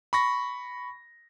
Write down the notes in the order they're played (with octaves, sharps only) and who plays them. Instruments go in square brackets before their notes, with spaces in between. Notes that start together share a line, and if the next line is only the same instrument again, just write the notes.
[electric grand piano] B5 C#6 A#6